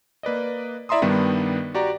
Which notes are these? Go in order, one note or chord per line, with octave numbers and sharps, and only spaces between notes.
A#3 B4 D5 D#5
E4 D5 E5 A#5 C6 D#6
G2 D#3 G3 B3 D4
F#4 G4 D5 A#5